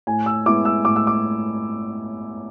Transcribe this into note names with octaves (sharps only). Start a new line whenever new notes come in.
A2 G#5
E6
G#3 B3 E4 D6
E6
A2 D6
E6
D6